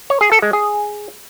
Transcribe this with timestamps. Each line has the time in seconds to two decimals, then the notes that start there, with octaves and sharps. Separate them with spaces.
0.10 C#5
0.21 G#4
0.32 A4
0.42 G#3
0.53 G#4